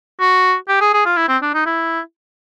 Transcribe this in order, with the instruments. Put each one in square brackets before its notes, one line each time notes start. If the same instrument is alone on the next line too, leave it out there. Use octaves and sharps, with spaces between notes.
[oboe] F#4
G4
G#4
G#4
F4
E4
C4
D4
D#4
E4